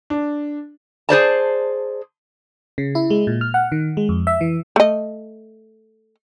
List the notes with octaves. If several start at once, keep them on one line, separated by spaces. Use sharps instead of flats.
D4
G#4 C5 D5 A5
C#3
E4
G#3
A#2
F6
F#5
D#3
G#3
F2
E5
E3
A3 D#5